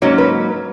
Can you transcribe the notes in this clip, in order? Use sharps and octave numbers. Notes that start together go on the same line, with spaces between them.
G#2 F#3 A#3 C#4 C#5
B4